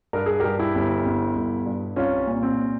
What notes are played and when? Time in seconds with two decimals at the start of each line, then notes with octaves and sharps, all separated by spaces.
0.13 G2 A#4
0.26 G#4
0.40 G2 G4 A#4
0.59 E4 G4
0.75 G1
1.06 G1
1.35 G1
1.66 G2
1.96 C2 C#4 F4
2.27 A#2
2.43 C4